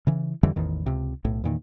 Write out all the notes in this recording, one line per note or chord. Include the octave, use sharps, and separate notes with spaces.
C#3 E3
F2 D3 E3 G3
A1 E2 D#3
C#2 C3
B1 A2
E2 A#2 D#3